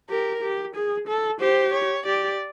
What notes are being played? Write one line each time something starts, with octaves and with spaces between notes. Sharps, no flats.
G4 A#4
G4
G#4
A4
G4 C5
C#5
G4 D5